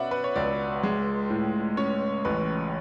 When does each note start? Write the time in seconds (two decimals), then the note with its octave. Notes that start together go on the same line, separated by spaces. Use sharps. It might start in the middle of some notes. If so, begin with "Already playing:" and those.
Already playing: B2 C#4 B4 D5 E5 F#5
0.11 B4
0.24 C#5
0.36 C#2 D5
0.83 G#3
1.30 A2
1.77 C#4 C#5
2.25 A1 B4